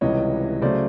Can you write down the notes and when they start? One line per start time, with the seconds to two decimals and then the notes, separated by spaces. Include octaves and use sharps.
0.01 C#2 C3 E3 G3 C#5 D#5
0.61 C#3 F#3 A3 C5 D5